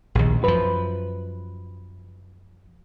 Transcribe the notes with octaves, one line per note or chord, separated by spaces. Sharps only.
A#1 D#2
F#2 F3 B4